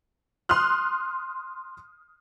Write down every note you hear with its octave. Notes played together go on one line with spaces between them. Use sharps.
C6 D#6 F6 F#6